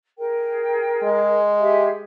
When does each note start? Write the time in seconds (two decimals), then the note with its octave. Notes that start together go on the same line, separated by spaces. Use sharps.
0.18 G#4 A#4 G5
1.03 G#3
1.59 G4 G#4 E5